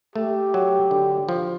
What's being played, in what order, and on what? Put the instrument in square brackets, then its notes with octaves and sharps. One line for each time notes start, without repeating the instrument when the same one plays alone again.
[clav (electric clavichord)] A3 [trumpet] G4
[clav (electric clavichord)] F#3
D3
F3